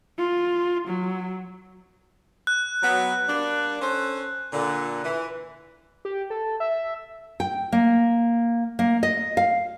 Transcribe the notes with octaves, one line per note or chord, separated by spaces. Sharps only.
F4
F#3
F#6
F#3 B3
G3 A#3 D4
C#4 A4 C5
A#2 D3
E3
G4
A4
E5
G5
A#3
A#3
D#5
F5